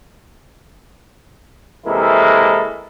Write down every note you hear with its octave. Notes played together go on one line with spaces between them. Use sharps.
C3 E3 G#3 A#3 E4 A4